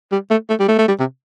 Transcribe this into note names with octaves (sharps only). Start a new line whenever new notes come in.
G3
A3
A3
G3
A3
A3
G3
C3